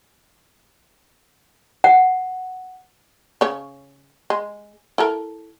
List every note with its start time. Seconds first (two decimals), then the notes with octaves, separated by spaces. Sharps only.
1.84 F#5
3.41 C#3 C#5
4.30 G#3
4.98 E4 A4 A#4